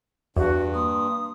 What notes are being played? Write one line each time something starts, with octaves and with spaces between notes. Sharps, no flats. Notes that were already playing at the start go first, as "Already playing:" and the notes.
E2 G2 F#4
A#3 C6 D#6